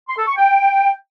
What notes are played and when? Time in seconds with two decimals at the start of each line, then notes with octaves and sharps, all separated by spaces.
0.08 C6
0.18 A4
0.27 C#6
0.37 G5